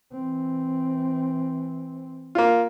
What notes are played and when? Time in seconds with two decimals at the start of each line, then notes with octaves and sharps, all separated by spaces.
0.12 E3 C4
2.35 A#3 F4